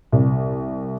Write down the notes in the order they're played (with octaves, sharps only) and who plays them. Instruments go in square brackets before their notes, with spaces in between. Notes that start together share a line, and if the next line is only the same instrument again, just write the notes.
[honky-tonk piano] C2